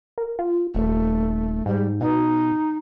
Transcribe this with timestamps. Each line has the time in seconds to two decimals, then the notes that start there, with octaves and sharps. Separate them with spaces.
0.18 A#4
0.39 F4
0.75 D#1 A3
1.66 G#2 G3
2.01 B2 D#4